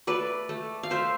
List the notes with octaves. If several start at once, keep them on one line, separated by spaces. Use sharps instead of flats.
A3 B4 D5
A3
F5
A3 C5 E5